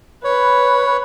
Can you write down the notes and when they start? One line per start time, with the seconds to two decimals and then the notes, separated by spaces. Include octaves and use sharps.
0.24 B4 C#5